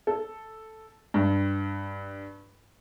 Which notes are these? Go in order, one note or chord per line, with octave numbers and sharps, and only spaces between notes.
A4
G2